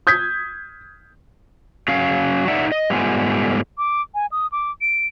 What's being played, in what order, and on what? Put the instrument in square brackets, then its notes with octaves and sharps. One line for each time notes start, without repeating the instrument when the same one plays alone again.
[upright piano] D#6 G6 G#6 B6
[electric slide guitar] F#3 C#4 F5
D#4 D5 E5 F#5
D#5
G#2 G3 A3 B3 F4 G#5
[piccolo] D6
G#5
D#6
D6
D7